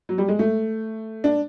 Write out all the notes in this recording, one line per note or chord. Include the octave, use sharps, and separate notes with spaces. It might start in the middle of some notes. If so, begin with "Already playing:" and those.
F#3
G3
G#3
A3
D4